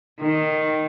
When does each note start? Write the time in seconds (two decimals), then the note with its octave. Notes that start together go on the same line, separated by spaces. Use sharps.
0.21 D#3